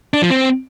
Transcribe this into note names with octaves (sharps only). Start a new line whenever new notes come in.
D4
F3
C4